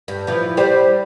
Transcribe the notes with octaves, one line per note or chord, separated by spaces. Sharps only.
G2
E3 F3
G3 G4 C5